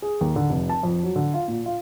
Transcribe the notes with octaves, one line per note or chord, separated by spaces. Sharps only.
G#4
D#2
D3
F1
A5
F2
F#3
D3
F4
A#2
F4